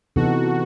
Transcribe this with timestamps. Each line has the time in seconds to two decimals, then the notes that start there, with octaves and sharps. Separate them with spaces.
0.16 C3 E3 B3 D#4 F#4 A4